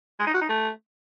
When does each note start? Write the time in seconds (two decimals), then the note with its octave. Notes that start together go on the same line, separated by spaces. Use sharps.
0.19 G#3
0.27 D#4
0.34 F#4
0.41 D#4
0.49 A3